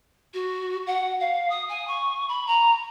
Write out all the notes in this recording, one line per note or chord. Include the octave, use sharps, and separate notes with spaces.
F#4
F#5
F5
D#6
G#5
C#6
B5
A#5